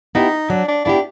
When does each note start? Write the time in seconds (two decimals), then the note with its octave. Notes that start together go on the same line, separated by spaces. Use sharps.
0.15 B3 D#4 E4 G4
0.50 F#3 D4
0.68 D4
0.85 B3 D4 E4 G4